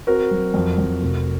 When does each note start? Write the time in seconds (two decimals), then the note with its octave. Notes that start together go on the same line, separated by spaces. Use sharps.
0.07 C4 F#4 A#4
0.31 F#3
0.54 F2
0.78 F2
1.02 F1